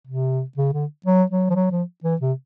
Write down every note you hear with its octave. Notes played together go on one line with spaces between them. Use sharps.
C3
C#3
D3
F#3
F#3
F3
F#3
F3
E3
C3